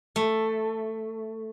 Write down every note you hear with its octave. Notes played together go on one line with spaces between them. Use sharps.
A3